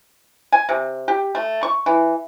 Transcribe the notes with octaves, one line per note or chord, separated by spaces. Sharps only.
G#5
C3
G4
A3
C#6
E3